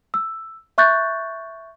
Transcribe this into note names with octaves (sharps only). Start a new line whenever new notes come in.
E6
E5 C#6 F#6 G6 A6